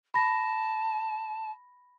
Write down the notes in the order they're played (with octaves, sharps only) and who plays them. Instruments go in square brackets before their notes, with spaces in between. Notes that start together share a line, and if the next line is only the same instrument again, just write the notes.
[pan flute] A5 [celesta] B5 A#6